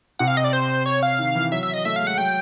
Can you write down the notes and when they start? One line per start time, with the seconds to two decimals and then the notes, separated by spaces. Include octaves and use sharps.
0.19 C3 F#5
0.28 F5
0.37 D#5
0.44 D5
0.53 C5
0.86 C#5
1.03 F5
1.19 D#3
1.35 E3
1.52 F#3 E5
1.63 E5
1.74 D#5
1.85 A3 E5
1.96 G#3 F5
2.07 F#5
2.18 F#3 G5